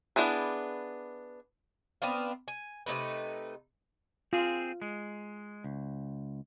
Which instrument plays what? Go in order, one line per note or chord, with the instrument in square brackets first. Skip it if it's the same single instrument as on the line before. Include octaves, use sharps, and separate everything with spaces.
[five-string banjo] B3 D4 E4 G#4 B4
[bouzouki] B3 C4 D4 F5
G#5
C3 A3 D#4 B4
[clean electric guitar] C4 G#4 [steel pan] F4
[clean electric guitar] G#3
C#2